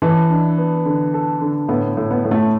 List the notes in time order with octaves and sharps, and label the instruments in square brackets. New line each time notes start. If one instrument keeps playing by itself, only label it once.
[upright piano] E3 [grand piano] A4
[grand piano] D4
B3
D3
A4
D3
[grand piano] A2 [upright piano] B3
[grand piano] A2
[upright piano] B3
[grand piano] A2
[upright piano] A3